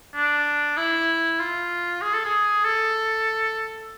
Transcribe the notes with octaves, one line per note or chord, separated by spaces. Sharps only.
D4
E4
F4
G#4
A4
G#4
A4